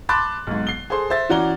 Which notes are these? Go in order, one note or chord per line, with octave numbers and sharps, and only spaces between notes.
A5 B5 C6 D6 F#6 A6
B1 G#2
C7 G7
G#4 A4 C5 C6
C5 E5 A6
E3 C#4 F#4 D5 A#5 G7